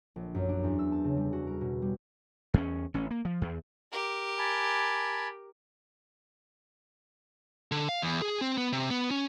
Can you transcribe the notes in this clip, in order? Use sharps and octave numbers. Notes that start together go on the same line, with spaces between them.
A#1
F#2
D4
E2
E6
A5
C#3
G3
F#4
A#4
B2
G3
E2 A#3 C#4
A1 C#4
A#3
F3
E2
G4 A#4
G#5 A5 B5
D3
F5
E2
G#4
C4
B3
C3
B3
C#4